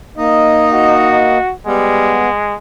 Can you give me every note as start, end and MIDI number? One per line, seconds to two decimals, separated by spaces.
0.17 1.38 58
0.17 1.33 63
0.17 1.38 75
0.73 1.52 66
1.67 2.23 55
1.67 2.55 56
1.67 2.29 59
1.67 2.29 78